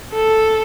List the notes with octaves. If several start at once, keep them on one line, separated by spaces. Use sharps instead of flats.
A4